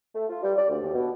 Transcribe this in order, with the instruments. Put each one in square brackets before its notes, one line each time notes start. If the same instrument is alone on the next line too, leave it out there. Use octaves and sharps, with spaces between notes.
[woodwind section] A3
F4
G3
D5
D2
D#2
B2